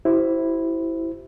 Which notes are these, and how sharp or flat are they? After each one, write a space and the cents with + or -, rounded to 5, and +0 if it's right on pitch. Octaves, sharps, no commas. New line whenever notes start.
E4 +0 G4 -45 C5 +0